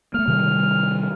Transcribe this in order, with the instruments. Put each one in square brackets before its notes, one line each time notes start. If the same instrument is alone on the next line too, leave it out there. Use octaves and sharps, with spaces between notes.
[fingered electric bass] A3 A#3 [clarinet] F6
[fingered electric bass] C3 D#3 G3